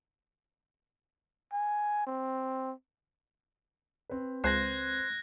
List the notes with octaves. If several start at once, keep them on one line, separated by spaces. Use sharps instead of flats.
G#5
C4
C4 B4
C#2 C5 F#6 G#6 A#6